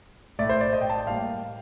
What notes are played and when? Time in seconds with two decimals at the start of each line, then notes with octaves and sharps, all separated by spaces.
0.39 A2 A3 D5
0.49 C5
0.61 D5
0.73 D#5
0.81 G5
0.90 A5
0.98 G5
1.06 A2 G3 A#3 F5